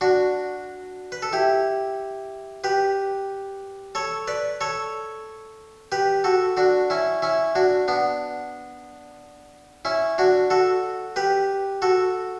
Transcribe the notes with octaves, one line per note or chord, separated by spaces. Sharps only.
D4 F#4
B4
A4
E4 G4
G4 B4
A4 C#5
B4 D5
A4 C#5
G4 B4
F#4 A4
D4 F#4
C#4 E4
C#4 E4
D4 F#4
B3 D4
C#4 E4
D4 F#4
F#4 A4
G4 B4
F#4 A4